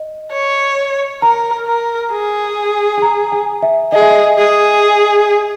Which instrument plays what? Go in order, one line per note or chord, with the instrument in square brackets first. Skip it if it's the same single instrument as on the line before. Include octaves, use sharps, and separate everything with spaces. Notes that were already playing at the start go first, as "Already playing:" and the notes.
Already playing: [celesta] D#5
[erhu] C#5
[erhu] A#4 [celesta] A#5
[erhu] A#4
G#4
[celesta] G#5
A#5
G#5
E5
[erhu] G#4 [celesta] D#5
[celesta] E5
D#5
[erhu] G#4